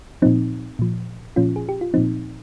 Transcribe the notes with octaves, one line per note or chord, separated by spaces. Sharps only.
A#2 F3 C4 D#4
A#2 F3
A#2 F3 C#4 F4
G#4
G4
F4
A#2 F3 C4 D#4